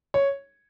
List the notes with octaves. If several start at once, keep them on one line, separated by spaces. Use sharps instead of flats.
C#5